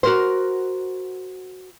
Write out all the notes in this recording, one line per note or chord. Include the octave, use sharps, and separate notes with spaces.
F#4 A#4 C5